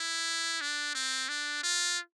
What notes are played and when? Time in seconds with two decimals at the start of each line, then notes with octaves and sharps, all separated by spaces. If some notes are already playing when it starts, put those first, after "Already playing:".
Already playing: E4
0.61 D4
0.95 C4
1.29 D4
1.63 F4